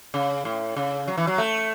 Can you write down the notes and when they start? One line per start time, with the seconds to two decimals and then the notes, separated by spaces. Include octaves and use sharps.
0.14 C#3
0.45 A2
0.76 C#3
1.08 F#3
1.17 E3
1.27 F#3
1.38 A3